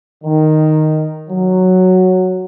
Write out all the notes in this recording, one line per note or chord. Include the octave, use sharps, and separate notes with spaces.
D#3
F#3